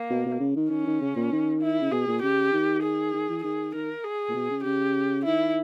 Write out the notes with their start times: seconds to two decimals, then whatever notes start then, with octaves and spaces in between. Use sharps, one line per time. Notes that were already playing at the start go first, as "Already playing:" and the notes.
Already playing: A#3
0.10 B2
0.26 B2
0.40 C#3
0.56 D#3
0.70 D#3 C#4
0.86 D#3
1.01 C#3
1.16 A#2
1.32 D#3
1.62 E4
1.81 C#3
1.92 B2 G#4
2.07 A#2
2.22 C#3 G4
2.52 D#3
2.83 G#4
3.14 D#3
3.29 E3
3.44 D#3 G#4
3.74 D#3 A#4
4.04 G#4
4.29 A#2
4.35 B2
4.50 C#3
4.65 C#3 G4
5.25 D#3 E4